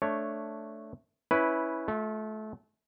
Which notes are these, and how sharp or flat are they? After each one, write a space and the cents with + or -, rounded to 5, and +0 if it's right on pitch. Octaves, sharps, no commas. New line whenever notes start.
A3 +0 D4 +0 C#5 +0
C#4 +0 E4 -15 B4 +0
A3 -25 F4 +20